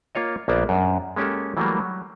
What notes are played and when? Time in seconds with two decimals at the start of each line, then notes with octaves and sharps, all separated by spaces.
0.15 A#3 F4 C#5 D#5
0.48 A#1 A#3 B3 C5 D5
0.69 F#2 D4
1.16 G#3 A#3 C#4 G4 A4
1.57 E3 F#3 G3 A3 A#3
1.80 F#3